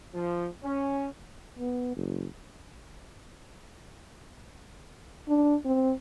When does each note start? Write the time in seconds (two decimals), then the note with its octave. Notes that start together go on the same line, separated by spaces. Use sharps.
0.13 F3
0.64 C#4
1.59 B3
1.96 F#1
5.28 D4
5.65 C4